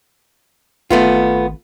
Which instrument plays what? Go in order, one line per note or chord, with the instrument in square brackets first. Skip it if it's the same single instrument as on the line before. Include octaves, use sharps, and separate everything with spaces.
[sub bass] G#1 [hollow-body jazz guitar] A3 B3 F4